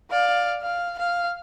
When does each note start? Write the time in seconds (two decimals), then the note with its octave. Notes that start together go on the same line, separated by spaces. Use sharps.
0.11 D5 F5
0.62 F5
0.98 F5